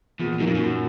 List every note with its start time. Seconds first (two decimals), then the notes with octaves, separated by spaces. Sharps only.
0.19 E2 A#2
0.40 F#2 F#3 A#3 D#4
0.47 F2
0.55 F#2
0.61 A#2